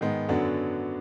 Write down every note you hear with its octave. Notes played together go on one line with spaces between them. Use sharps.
G#2 D#3 G#3 B3
F#2 D3 F#3 B3 D4